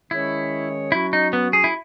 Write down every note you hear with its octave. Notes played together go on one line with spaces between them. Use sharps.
D#3 G#3 C#4 E4 G#4 C#5
F#3 C#4 E4 F#4
D#4
B3
G#4
E4